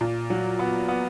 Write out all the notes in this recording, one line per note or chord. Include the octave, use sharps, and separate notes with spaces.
A#2
F#3
B3
B3